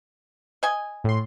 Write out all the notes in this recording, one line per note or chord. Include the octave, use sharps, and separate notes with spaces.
D#5 G#5
A2 C6